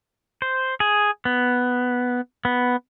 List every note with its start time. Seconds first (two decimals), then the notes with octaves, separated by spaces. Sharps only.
0.42 C5
0.80 G#4
1.25 B3
2.45 B3